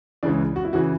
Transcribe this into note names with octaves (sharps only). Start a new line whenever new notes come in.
C#2 C#3 E3 D4
F#4
E4
C#3 E3 F#4